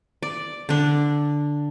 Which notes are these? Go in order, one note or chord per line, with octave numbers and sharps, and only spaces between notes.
D5
D3 D4